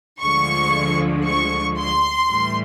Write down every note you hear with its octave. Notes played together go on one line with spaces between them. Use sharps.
D2 D3 F3 G#3 C#6
C#6
C6
A2 E3 G3